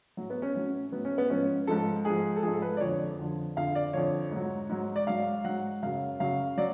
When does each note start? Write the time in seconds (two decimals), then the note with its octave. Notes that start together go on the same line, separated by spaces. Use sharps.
0.17 A2 F#3
0.30 B3
0.42 C#4
0.54 A2 F#3 C#4
0.92 A2 F#3 B3
1.05 C#4
1.18 B3
1.30 G#2 F3 C#4
1.67 G#2 F3 A4
2.05 G#2 F3 G#4
2.36 A4
2.43 G#2 F3 G#4
2.53 A4
2.62 B4
2.77 D5
2.80 F2 D3 F3 C#5
3.18 F2 D3 F3
3.56 F2 D3 F3 F5
3.75 D5
3.93 F2 D3 F3 C#5
4.31 G#2 F#3
4.70 G#2 F#3
4.96 D5
5.07 G#2 F#3 F5
5.45 G#2 F#3 F#5
5.83 F#2 C#3 F#3 F5
6.20 F#2 C#3 F#3 F5
6.57 F#3 D5